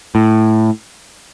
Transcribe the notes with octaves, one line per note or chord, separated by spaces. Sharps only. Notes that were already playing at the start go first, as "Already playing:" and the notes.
A2